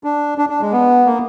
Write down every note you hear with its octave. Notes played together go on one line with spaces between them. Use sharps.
D4
D4
D4
G#3
B3
A#3